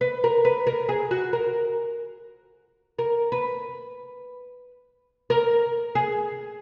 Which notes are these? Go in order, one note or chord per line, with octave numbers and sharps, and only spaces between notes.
B4
A#4
B4
A#4
G#4
F#4
A#4
A#4
B4
A#4
G#4